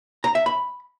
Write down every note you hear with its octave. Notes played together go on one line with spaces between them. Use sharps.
A#5
E5
B5